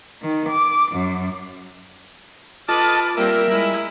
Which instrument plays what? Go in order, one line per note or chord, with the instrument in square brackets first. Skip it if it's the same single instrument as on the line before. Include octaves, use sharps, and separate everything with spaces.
[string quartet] D#3
D6
F#2
[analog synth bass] F4 [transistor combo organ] A4 D#5 A5 [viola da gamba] B4 [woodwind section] D6 F6
[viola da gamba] G3 A#3 C4 [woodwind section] A#4 [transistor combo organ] E5
[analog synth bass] G3 [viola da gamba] G#3 E4